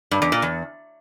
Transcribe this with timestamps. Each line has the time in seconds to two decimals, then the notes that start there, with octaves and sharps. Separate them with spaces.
0.11 G2
0.22 E2
0.32 A#2
0.42 E2